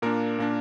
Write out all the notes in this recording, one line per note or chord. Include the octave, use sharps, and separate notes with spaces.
A#2 A#3 D4 A#4
A#2 A#3 D4